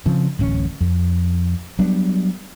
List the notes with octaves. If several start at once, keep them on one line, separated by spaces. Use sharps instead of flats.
C#3 F3 C4
D1 A1 C4 C#4
F2
F#3 G3 B3 D4